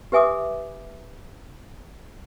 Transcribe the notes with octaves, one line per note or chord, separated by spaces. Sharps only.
G4 B4 E5 G#5 D6 D#6